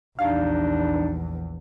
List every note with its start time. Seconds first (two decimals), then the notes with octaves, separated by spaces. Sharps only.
0.19 A#1 E2 G3 D4 D#4 F5